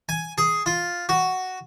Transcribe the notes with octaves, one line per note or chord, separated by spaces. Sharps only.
G#5
G#4
F4
F#4